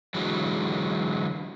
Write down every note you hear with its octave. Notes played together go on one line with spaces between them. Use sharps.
D3 E3 F#3 G#3